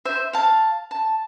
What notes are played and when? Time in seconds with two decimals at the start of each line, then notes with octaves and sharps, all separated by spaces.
0.05 C5 E5
0.33 F5 A5
0.91 A5